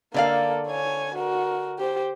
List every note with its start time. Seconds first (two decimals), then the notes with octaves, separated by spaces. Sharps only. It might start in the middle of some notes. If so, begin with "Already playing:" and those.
0.14 D3 A#3 A4 D5 F5
0.67 C#5 G#5
1.14 F#4 A#4
1.79 G4 C5